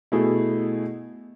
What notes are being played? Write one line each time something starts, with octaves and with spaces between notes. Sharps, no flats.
B2 A3 E4 G#4